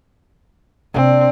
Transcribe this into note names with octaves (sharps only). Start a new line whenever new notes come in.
C3 A#3 C4 D4